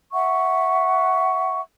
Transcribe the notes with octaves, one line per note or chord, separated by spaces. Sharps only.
E5 F#5 C#6